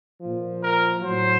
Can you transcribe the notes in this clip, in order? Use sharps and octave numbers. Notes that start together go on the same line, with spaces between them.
A#2 F3
A#4
A2 F#3 C5